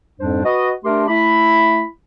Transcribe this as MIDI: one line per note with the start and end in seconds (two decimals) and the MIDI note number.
0.19 0.42 41
0.19 0.42 44
0.19 0.42 55
0.19 0.42 62
0.19 0.42 72
0.44 0.70 66
0.44 0.70 71
0.44 0.70 75
0.85 1.04 57
0.85 1.04 62
0.85 1.04 67
0.85 1.04 70
0.85 1.04 84
1.08 1.85 57
1.08 1.85 64
1.08 1.85 83